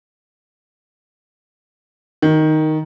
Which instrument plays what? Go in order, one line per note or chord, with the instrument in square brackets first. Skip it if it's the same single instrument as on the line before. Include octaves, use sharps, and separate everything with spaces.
[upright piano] D#3